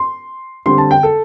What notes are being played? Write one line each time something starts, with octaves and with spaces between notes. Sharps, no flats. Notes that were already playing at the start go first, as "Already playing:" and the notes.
Already playing: C6
D3 G3 C4 C6
A5
G5
A4